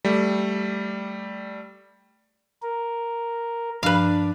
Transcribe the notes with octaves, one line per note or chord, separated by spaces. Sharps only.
G3 A3
A#4
G2 F3 D4 B4 F5